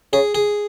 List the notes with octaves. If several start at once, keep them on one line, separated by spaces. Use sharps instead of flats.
C#3 G#4
G#4